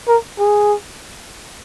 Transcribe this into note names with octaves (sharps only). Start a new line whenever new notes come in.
A#4
G#4